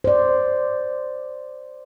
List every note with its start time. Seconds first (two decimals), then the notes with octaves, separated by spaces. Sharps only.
0.04 C5 D5